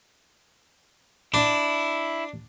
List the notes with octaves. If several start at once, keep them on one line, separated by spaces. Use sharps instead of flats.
D4 E4